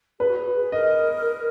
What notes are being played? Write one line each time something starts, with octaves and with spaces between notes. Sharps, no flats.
G#4 B4
F#4
G#4
G#4
A#4 D#5